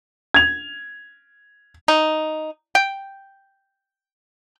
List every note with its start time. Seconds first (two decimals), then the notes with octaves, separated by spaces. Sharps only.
0.34 G#6 F7
1.88 D#4
2.75 G5